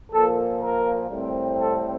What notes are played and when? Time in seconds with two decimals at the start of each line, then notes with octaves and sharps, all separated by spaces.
0.11 A#2 F3 A#3 A4
0.61 A#4
1.09 A2 G3 C4
1.58 A4